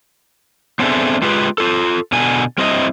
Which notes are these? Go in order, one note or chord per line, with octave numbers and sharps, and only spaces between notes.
B3 C4 D4 G#4 A4 E5
G#3 F4 G4 G#4 B4 G5
F4 A4
B2 D3 G#5
G3 C4 E4 D#5